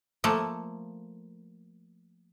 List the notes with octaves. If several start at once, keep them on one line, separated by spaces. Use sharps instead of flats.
F3 A3 A#3